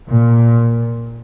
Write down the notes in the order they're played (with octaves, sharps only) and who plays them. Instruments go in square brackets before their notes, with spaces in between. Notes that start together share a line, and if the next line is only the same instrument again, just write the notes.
[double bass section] A#2